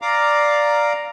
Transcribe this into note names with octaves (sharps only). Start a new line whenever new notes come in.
D5 F5 A#5 D6